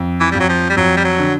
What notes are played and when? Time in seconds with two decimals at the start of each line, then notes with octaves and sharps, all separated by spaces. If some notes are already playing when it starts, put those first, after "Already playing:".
Already playing: F2
0.20 E3
0.32 F2 G3
0.40 F#3
0.49 F3
0.69 G3
0.76 F2 F#3
0.97 G3
1.04 F#3
1.19 D3